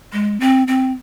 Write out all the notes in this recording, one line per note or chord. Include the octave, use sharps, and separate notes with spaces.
G#3
C4
C4